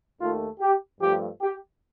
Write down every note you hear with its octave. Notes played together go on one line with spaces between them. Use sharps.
D#2 D#3 A3 F4
G4
G2 F3 A3 G4
G4